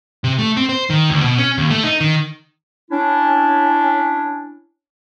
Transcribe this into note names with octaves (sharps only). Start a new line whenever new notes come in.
C3
A3
C4
C5
D#3
D2
B2
C#4
D#2
A3
D#4
D#3
C#4 D4 E4